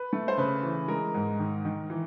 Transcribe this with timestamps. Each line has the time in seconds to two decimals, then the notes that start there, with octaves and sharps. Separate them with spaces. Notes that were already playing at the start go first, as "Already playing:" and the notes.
Already playing: B4
0.13 A3
0.28 C5
0.38 C#3 B4
0.63 E3
0.88 G#3 A#4
1.14 G#2
1.39 D#3
1.65 D#3
1.90 E3